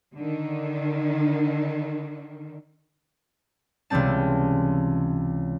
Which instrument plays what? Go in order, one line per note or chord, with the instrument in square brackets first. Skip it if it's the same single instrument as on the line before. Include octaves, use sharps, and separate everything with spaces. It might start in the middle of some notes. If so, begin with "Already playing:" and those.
[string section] D3 D#3
[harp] C#2 C3 E3 G3 C4 A5